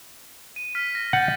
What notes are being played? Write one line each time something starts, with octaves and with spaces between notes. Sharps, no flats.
D#7
F6 B6
A#6
F#5 G6 A6